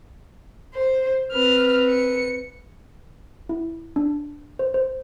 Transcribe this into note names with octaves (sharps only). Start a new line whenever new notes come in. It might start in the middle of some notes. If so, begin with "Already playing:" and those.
C5
C4 B4 F6
C#7
E4
D4
C5
C5